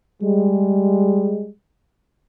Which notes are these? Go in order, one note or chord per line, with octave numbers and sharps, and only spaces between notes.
G3 G#3